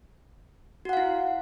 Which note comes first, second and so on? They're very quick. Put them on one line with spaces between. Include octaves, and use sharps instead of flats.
F#4 F#5 F5 E4